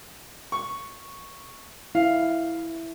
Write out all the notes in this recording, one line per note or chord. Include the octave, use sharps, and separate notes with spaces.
C#6
E4 F5